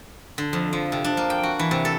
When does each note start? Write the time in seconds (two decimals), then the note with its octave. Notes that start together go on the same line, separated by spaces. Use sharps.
0.38 D3
0.53 F2
0.73 F3
0.92 C3
1.04 D4
1.17 A#3
1.30 G5
1.43 F#4
1.59 E3
1.71 C3
1.85 A4